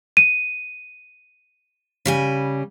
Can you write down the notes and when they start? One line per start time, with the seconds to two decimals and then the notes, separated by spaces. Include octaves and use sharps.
0.17 D#7
2.06 C#3 G3 G#5